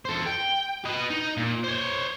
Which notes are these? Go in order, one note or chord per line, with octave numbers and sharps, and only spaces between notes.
A4 C5
G5
B4 D#5
D#4
A#2
C5 C#5